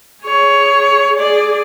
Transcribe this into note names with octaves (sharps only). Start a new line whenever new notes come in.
G#4 C#5
G#4 D5